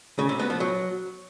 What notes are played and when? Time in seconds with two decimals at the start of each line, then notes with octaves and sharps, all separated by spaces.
0.19 C#3
0.29 C3
0.39 B3
0.50 F3
0.60 F#3